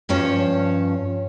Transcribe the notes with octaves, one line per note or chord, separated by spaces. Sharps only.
G2 F3 C#4 C#5 A5